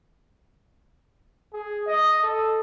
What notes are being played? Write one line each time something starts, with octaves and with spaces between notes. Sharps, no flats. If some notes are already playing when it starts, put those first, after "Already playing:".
G#4
D#5
A4